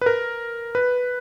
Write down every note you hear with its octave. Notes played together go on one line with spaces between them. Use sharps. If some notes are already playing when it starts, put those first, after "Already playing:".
B4
A#4
B4